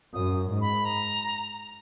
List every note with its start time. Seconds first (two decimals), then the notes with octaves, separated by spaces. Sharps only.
0.14 F#2 D#6
0.49 G#2
0.61 B5
0.85 A#5